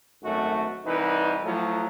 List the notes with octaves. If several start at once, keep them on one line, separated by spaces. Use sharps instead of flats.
G#1 F#2 A3 F#4
C2 E3 D#4 B4
A2 F3 F#3